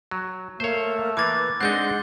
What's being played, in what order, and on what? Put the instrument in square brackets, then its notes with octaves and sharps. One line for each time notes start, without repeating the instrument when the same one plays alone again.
[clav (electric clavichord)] F#3
[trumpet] A3 [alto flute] A#3 [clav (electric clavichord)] C5 C#5
[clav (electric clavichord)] E3 A#3 [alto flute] B4 [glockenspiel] D6 G#6 A6
[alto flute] G#3 [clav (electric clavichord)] C4 D4 D#4 [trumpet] F#5 [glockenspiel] F#6 G6 G7